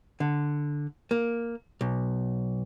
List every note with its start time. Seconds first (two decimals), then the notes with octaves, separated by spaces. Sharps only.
0.20 D3
1.11 A#3
1.81 B1